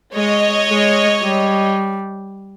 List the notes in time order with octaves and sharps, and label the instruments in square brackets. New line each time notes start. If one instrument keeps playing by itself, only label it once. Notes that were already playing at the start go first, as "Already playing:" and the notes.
[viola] G#3 [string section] C#5 D#5
[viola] G#3
G3